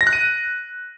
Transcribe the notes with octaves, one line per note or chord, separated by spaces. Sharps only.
A#6
F#6
D#7